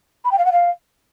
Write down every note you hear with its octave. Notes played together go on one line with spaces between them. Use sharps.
B5
G5
F5
F#5
F5